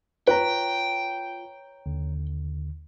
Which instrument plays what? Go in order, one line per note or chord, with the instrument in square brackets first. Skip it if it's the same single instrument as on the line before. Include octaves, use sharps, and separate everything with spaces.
[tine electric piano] F4 [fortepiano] B4 [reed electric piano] C#5 A#5 [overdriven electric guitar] G5
[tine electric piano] D#2 D3